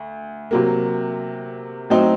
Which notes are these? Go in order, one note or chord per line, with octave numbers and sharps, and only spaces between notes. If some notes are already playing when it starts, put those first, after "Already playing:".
Already playing: D2
C3 F#3 A#3
A2 F#3 C4 D#4